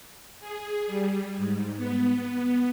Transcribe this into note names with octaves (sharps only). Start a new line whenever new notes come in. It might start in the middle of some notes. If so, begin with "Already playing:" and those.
G#4
G3
G#2
B3